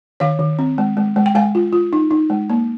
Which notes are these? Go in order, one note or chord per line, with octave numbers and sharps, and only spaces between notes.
D#3 C#5 F5
D#3
C4
G#3
G#3
G#3
G5
G#3 F5 G#5
F4
F4
D#4
D#4
G#3
A#3